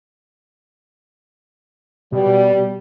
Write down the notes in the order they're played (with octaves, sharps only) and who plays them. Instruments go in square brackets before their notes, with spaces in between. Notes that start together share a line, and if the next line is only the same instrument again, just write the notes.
[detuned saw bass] B2 [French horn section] G3